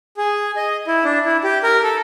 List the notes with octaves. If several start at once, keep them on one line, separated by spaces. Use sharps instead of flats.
G#4
D#5
E4
D4
E4
G4
A#4
A4